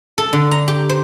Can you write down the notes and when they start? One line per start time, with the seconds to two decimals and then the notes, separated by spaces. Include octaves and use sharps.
0.18 A4
0.33 D3
0.51 A#5
0.68 G4
0.89 C5